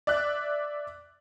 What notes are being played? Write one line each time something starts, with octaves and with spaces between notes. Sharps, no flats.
D5 E5 F#6